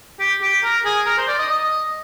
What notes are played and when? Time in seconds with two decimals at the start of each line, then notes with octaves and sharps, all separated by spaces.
0.20 G4
0.42 G4
0.64 A#4
0.85 G#4
1.06 A#4
1.18 C5
1.27 D5
1.39 D#5
1.49 D#5